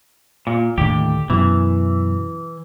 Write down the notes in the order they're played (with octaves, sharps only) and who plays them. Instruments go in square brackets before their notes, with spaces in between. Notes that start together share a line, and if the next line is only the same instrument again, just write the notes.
[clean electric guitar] A#2
[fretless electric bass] D#2 A2 D3 [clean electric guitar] G4
[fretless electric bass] F#2 B2 [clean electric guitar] E3